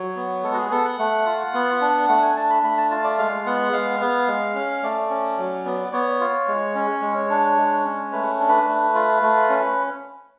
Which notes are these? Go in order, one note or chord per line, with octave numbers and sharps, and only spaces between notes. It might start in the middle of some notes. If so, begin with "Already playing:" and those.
Already playing: F#3 C#5
B3
G#3 A4
F#4
G#4
B3 A4
F#5
A3
F4
B3
D4
A3 F#5
G#5
D4 A5
B5
A3 B5
A5
F4 A5
D5
G#3 F5
B3 F#5
G#3 F5
B3
G#3
C#4
A3 D5
C#4
F#3
B3
B3 C#5
F4
G#3
C#4
G#3
D4
G#3
C#4
A3 B4
D4
B4
A3
F4
A3
C#4